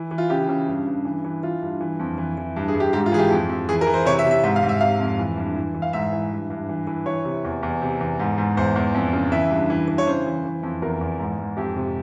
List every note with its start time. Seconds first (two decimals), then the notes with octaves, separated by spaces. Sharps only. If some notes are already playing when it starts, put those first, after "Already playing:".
Already playing: E3
0.11 E3
0.18 F4
0.30 C#3 G4
0.49 C#3
0.68 G2
0.87 G2
1.05 E3
1.24 E3
1.43 E3 F4
1.62 G2
1.81 E3
1.99 F2
2.18 E3
2.38 E3
2.56 G2
2.68 G#4
2.75 G2
2.80 G4
2.93 G#2 G4
3.06 F4
3.12 E3 G#4
3.19 G4
3.30 F2
3.49 F2
3.69 E3 G#4
3.81 A#4
3.87 E3
3.94 C5
4.05 C3 C#5
4.19 E5
4.24 C3
4.31 E5
4.43 G#2 E5
4.56 F5
4.63 G#2
4.69 E5
4.81 C3 F5
5.00 F2
5.19 E3
5.37 G2
5.56 E3
5.75 E3
5.82 F5
5.93 G#2 E5
6.12 E3
6.31 G2
6.50 G2
6.69 E3
6.87 E3
7.06 E3 C#5
7.25 C3
7.45 E2
7.63 E2
7.82 C3
8.01 E2
8.19 G#2
8.38 G#2
8.57 E2 C5
8.76 E2
8.94 F2
9.13 C#3
9.32 E3 E5
9.51 G2
9.70 E3
9.88 E3
9.98 C#5
10.07 C#3 C5
10.26 E3
10.45 E3
10.63 F2
10.82 E2 A#4
11.01 E2
11.20 G#2
11.38 G#2
11.57 F2 G4
11.76 C3